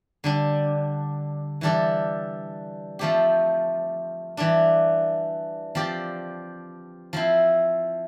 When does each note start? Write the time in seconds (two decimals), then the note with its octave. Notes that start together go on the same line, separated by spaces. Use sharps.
0.24 D3 G3 D4
1.61 E3 G3 D4 A4
2.99 F3 A3 C4 G4
4.37 E3 G3 D4
5.75 F3 C4 G4 D5
7.13 F3 C4 E4